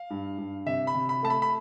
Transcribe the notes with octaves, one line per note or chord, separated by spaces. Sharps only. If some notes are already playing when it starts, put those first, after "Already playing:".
Already playing: F5
G2
G2
C3 E5
B5
C3
B5
A3 A5
B5
B5